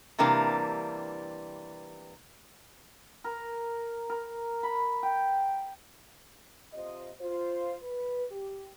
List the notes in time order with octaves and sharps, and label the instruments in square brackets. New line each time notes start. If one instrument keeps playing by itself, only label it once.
[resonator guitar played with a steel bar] C3 E3 G3 A#3 D4
[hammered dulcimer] A#4
A#4
B5
G5
[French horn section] C3 F4 C5 D#5
F4 C5
B4
G4